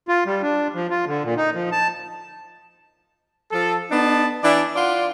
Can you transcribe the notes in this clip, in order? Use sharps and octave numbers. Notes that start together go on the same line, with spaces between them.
F4
G3
D4
F3
F4
D3
A#2
D#4
F3
A5
F3 A4
B3 D4 D#4 A5
E3 D4 D5 E5
F4 D5 F#5 C6